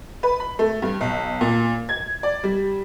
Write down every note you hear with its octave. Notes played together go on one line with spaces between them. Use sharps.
B4
B5
A3
G2
B1
A#2
G#6
D5
G3